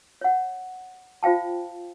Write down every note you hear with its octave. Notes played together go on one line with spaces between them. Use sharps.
C#5 F#5
F4 C5 F5 G5 A5